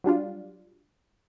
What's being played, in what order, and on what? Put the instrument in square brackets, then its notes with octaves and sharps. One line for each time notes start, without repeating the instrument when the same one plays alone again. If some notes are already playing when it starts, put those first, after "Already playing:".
[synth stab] F#3 G3 D4 F4